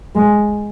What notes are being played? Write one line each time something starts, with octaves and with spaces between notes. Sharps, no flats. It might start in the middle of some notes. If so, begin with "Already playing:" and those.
G#3